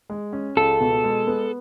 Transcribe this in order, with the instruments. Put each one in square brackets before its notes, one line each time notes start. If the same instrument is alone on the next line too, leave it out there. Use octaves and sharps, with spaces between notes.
[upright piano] G#3
C#4
[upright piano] C#2 [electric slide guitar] A4
[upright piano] B2
G#3
B3